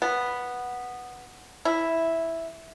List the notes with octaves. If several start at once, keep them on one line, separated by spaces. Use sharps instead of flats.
B3
E4